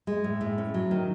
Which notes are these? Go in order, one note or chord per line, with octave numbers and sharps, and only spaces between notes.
G#3
A2
A2
C#4
F#3
D#3